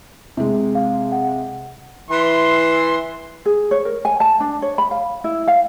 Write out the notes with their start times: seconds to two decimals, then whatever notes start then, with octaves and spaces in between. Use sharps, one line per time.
0.37 C3 G#3
0.75 F5
1.12 F#5
2.10 E3 C6
3.46 G#4
3.71 C#5
3.85 A#4
4.05 G#5
4.20 A5
4.40 D4
4.62 C#5
4.78 B5
4.91 F5
5.24 E4
5.48 F5